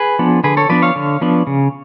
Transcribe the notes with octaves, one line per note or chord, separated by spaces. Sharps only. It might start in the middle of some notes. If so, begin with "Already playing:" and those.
Already playing: G#4 B4
F3 B3 D4
D3 G#4 B4
A4 C#5
F3 B3 D4 B4 D5
C#5 F5
D3
F3 B3 D4
C#3